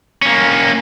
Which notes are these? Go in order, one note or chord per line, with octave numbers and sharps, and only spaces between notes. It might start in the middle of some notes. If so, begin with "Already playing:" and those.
A#3 C#4